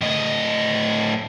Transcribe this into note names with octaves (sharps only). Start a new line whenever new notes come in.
A2 D#5